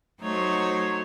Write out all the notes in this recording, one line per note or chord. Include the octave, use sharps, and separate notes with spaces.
F#3 A3 D#4 C5 C#5